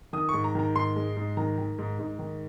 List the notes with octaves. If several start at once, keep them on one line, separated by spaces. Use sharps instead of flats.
D#3 D#6
G#2 C#6
A#5
D#3 A#5
G#2 C6
G#3
G#2
D#3 A#5
D#3
G#2
G#2
D#3